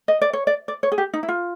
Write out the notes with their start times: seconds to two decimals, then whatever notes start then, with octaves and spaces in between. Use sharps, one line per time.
0.08 D#5
0.21 D5
0.33 C#5
0.47 D5
0.68 D5
0.83 C#5
0.92 G#4
0.98 G4
1.14 D#4
1.23 E4
1.29 F4